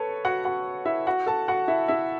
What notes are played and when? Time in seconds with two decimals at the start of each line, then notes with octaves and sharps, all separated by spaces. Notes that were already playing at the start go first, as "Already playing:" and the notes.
Already playing: A4 B4 C#5
0.25 F#4 F#5
0.45 F#4 F#5
0.85 E4 E5
1.07 F#4 F#5
1.26 A4 A5
1.48 F#4 F#5
1.68 E4 E5
1.88 E4 E5